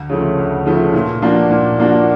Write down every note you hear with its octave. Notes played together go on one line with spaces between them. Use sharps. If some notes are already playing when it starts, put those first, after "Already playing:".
Already playing: D2
C#3 F3 A3
D2
C#3 F3 A3
A#2
F3 A#3 D4 F#4
A#2
F3 A#3 D4 F#4